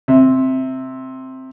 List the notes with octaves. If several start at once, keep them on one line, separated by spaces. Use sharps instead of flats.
C3